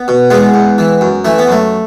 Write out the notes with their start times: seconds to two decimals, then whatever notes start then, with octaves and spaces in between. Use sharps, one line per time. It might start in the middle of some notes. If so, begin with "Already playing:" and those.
Already playing: B3
0.08 B2
0.30 E2 G#3 B3
0.54 E2
0.78 E3
1.01 F#2
1.25 E3 A3
1.38 B3
1.48 F#2 A3